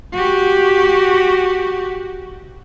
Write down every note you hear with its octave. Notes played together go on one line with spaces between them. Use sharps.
F#4 G4